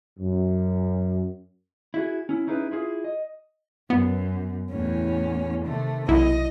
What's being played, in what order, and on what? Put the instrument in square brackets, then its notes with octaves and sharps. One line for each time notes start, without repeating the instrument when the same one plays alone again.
[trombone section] F#2
[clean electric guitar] E4 F#4 G#4
C#4 E4
C#4 D#4 E4 G#4 B4
E4 F4 G#4
D#5
[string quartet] F#2 [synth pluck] B3
[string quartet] E2 A2 C#4
C3 D#3 A3
[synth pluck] B1 E4 [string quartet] D#5